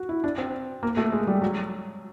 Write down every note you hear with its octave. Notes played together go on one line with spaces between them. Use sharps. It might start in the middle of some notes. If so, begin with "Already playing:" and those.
Already playing: F#4
E4
D4
C4
A#3
A3
G#3
G3
F#3